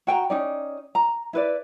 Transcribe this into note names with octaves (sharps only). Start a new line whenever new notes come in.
F#4 G5 G#5 A#5
C#4 D#4 D5
A#5
E4 B4 D5